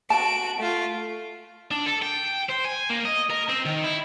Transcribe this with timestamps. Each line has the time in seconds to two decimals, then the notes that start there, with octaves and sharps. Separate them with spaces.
0.10 F#4 A5 D7
0.58 A3 F4
1.71 D4
1.86 A4
2.02 G5
2.49 C5
2.65 G#5
2.90 A#3
3.05 D#5
3.30 A#4
3.49 C4
3.65 D#3
3.84 E4